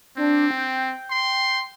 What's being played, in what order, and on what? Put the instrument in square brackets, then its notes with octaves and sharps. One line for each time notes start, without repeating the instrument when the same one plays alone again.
[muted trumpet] C4 [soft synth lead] D4
[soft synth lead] G5
[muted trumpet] C6